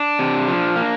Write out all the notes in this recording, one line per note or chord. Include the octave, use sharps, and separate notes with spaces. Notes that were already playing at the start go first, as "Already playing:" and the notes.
Already playing: D4
C3
F3
A#3